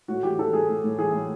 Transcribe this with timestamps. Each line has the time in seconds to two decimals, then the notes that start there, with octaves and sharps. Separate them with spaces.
0.08 A2 F#4
0.23 E3 G4
0.38 E3 A4
0.53 A2 G#4
0.69 A2
0.84 A2
0.99 E3 G#4
1.13 A2